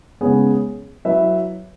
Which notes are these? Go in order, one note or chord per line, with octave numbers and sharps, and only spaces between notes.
C#3 G#3 B3 G#4 C#5
F#3 E4 B4 E5